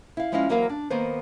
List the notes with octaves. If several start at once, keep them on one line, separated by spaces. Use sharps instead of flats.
E4 F5
F3 G#3 C#4 E4 D#5 F5
E3 F#3 A#3 C4 A#4 F5
D4
D#3 A#3 B3 B4 C5